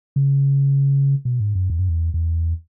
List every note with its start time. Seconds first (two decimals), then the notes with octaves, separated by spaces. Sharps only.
0.16 C#3
1.25 B2
1.40 G#2
1.55 F#2
1.70 E2
1.79 F#2
1.89 E2
2.14 E2